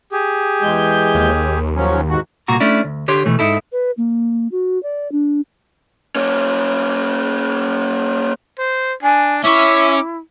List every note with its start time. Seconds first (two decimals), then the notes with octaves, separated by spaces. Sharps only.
0.12 G4 G#4
0.62 E2 G#3 G6
1.15 D#2
1.76 F3 F#3 C#4
2.10 G#2 F#4
2.48 C2 A#2 F#4 A#5
2.60 A3 C#4 D4 E4
2.84 D2
3.08 D3 G4 C#5 C6
3.26 B2 E3 A3
3.39 G#2 C3 D#4 E4 A4
3.72 B4
3.97 A#3
4.52 F#4
4.83 D5
5.12 D4
6.16 A#3 C#4
8.59 C5
9.03 D4 G#5
9.44 C#4 E4 C#5 E5 D6